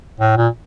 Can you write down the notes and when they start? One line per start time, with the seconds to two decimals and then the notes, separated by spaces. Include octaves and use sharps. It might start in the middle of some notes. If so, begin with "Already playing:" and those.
0.20 A2
0.37 A#2